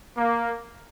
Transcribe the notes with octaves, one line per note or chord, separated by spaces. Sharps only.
A#3